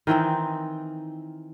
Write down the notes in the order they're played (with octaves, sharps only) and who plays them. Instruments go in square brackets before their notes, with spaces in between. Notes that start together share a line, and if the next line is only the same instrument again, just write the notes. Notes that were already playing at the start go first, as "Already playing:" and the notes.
[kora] D#3 E3 C4 D#4